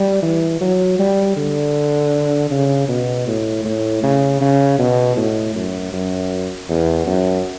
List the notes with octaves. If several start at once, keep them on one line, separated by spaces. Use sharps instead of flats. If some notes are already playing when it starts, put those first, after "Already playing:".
Already playing: G3
E3
F#3
G3
D3
C#3
B2
A2
A2
C#3
C#3
B2
A2
F#2
F#2
E2
F#2